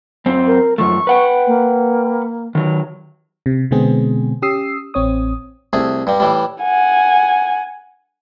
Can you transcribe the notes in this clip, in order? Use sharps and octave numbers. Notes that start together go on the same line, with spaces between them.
F#2 C4
A#4
F#2 F3 A3 C#6
B4 F#5 G5
A#3
D#3 F#3
C3
B2 D3 G#3 B3 C4 G#4
C#4 G4 D#6 E6 C7
A1 C4 C#5 D#6
C2 A3 G#4
G2 G3
A2 E3 G3
F#5 G#5